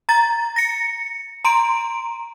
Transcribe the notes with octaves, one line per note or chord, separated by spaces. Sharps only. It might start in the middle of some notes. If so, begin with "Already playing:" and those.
A#5 A6
A#6 C#7
A#5 C6 D7